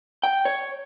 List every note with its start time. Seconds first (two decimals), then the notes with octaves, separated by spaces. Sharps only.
0.23 G5
0.45 C#5